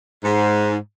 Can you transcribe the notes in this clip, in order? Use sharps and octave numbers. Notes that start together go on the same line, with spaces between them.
G#2